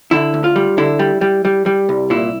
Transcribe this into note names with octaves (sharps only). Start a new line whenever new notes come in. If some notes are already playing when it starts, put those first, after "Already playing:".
D3 E4
D2
F4
G3
D3 E4
G3
G3
G3
G3
C2
A#2 E4